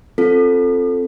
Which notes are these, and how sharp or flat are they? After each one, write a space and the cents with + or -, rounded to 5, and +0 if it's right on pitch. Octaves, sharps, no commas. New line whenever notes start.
C4 +10 F4 +0 A4 +0